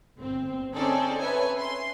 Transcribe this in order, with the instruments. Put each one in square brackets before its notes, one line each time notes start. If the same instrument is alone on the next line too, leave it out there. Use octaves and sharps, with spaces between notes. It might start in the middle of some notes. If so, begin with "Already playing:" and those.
[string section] G1 C4
C4 C#4 D#4 G#4 A4 D5
B4 C#5 E5 G#5
C6